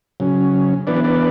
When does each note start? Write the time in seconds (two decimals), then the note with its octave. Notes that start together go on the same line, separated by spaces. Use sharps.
0.20 C#3 F#3 C#4
0.87 E3 B3 D4 B4 D5
1.04 B4 D5